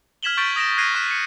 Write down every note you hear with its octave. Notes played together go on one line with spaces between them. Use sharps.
F6 G#6 B6 E7 F#7 G7
C#6 G6 A6 B6 D7
D#6 A#6 D7 E7
F#6 G#6 A#6 C7 D#7
C#6 F#6 B6 E7
C#7